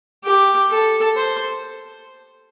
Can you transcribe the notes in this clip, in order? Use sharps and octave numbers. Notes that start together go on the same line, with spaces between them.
G4
A4
C5